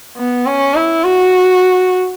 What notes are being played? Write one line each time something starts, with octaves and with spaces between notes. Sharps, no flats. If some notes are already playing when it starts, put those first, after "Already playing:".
B3
C#4
E4
F#4